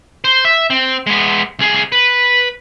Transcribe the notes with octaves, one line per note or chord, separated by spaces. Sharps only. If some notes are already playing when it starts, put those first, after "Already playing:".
C5
E5
C4
G#3 B3
C2 G#4
B4